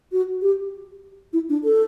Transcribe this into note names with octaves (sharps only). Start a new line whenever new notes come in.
F#4
G4
E4
D4
A4